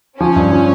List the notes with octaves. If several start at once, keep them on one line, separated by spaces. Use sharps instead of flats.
F3 C#4
G2
F3